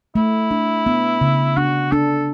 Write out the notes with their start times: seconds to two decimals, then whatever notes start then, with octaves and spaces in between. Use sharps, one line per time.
0.15 A3 E4
0.51 D4
0.86 B3
1.21 C#3
1.57 D4 F#4
1.92 D4 A4